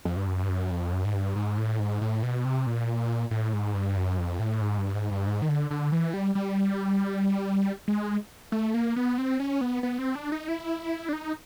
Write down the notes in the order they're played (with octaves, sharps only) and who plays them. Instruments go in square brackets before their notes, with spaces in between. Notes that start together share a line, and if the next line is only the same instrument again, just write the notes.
[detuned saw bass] F2
G2
F#2
G2
F#2
F2
F#2
G#2
G2
G#2
A2
G#2
A2
B2
C3
A#2
A2
G#2
G2
F#2
F2
A2
G#2
G2
G#2
G2
G#2
D#3
D3
D3
E3
G3
G3
G#3
A3
A#3
B3
C4
C#4
B3
B3
C4
D4
D#4
E4
D4
D#4